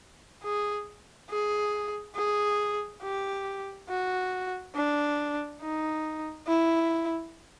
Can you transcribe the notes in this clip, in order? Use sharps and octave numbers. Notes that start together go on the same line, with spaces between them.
G#4
G#4
G#4
G4
F#4
D4
D#4
E4